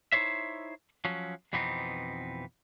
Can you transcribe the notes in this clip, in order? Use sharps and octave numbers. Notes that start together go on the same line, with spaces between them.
D#4 E4 F#4 C5 C#5 E5
F3 F#3 C#4
F2 B2 E3 B3 C4 D#4